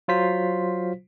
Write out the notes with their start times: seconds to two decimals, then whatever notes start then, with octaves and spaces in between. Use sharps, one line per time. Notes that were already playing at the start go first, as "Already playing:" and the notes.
0.08 F#3 F4 C5 B6